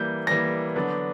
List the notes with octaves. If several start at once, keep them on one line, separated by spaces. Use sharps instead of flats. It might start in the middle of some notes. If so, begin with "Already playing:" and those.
Already playing: E3 G3 A#3 G6
E3 G3 A#3 A#6
D3 F#3 B3 D4